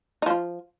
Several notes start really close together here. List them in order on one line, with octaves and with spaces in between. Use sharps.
D#4 F3 F4